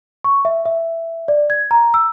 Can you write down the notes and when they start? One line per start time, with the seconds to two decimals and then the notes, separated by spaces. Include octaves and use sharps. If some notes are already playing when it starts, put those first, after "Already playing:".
0.24 C#6
0.45 E5
0.66 E5
1.28 D5
1.50 G#6
1.71 A#5
1.94 E6